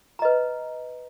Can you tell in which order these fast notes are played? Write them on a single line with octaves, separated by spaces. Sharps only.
A#5 D#5 B4